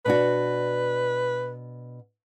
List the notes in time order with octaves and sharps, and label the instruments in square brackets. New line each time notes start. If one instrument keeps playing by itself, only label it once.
[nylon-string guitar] B2 D4 F#4 [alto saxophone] B4